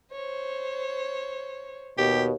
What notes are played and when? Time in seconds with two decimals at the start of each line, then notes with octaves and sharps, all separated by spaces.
0.12 C5 C#5
1.98 D#2 B2 G4